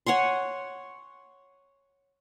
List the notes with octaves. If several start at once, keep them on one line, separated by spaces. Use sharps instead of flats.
C#5 F#5 G#5 C6